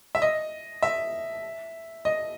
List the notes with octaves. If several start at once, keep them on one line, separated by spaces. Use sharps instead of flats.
E5
D#5
E5
D#5